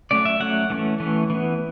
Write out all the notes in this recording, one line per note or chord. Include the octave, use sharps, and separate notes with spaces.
F#3 A3 C#4 D5
E5
F#3 A3 C#4 F#5
E3 A3 C#4
E3 A3 C#4
E3 B3